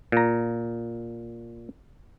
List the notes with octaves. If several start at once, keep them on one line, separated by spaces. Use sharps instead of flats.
A#2 A#5